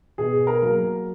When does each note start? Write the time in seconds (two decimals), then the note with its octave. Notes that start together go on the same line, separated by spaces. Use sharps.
0.18 B2 G#4
0.47 A#4
0.62 F#3 A#3